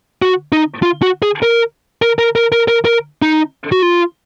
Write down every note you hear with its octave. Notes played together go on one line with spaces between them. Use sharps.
F#4
D#4
F4
F#4
G#4
A#4
A#4
A#4
A#4
A#4
A#4
A#4
D#4
F#4
F4